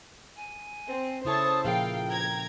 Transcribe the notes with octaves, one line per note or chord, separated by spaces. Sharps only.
G#5
C4
C#3 E4 A4 C5 C#5 A5 D#6
A#2 F3 G#4 A#4 F5 G5
G5 A#5 G#6